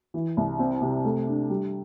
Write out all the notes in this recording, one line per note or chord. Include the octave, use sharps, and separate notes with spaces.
E3
C2
C4
C3
A3
D4
G3